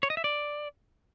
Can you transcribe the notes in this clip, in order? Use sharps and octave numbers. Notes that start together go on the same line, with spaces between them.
C#5
D#5
E5
D5